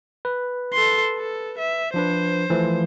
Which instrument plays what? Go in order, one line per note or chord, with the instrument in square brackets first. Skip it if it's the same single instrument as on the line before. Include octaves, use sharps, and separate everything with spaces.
[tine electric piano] B4
[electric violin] A4 C6
A4
E5
[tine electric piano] F3 D4 B4 [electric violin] C5
[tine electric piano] E3 F3 A3